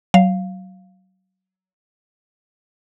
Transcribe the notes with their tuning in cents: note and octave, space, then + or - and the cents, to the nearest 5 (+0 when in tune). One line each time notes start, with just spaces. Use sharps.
F#3 +25 F5 -5